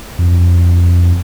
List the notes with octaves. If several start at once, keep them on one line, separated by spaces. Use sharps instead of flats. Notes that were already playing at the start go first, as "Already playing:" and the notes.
F2